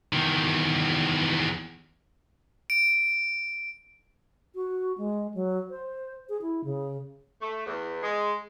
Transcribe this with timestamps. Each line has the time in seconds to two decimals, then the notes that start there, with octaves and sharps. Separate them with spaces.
0.13 E2 D#3
2.70 D7
4.55 F#4
4.98 G#3
5.34 F#3
5.70 C5
6.29 G#4
6.42 E4
6.64 C#3
7.41 A3
7.67 E2
8.03 G#3